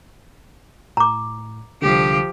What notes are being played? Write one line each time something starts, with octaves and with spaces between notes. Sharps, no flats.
A2 A#5 D6
C2 D3 F3 G4